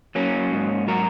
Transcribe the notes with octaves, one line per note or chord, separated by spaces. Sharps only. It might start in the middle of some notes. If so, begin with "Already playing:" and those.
F#3 A#3 C#4
G#2
F#3 F#4 A#4